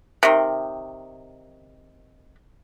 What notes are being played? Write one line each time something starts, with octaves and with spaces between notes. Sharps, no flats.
C3 D#3